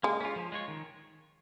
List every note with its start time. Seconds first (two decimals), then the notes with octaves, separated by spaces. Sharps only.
0.03 G#3 A#3
0.20 C#4 F4
0.36 F3
0.52 G#3 F4 C#5
0.68 D#3